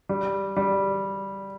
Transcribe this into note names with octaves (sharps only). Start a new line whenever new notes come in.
G3
G3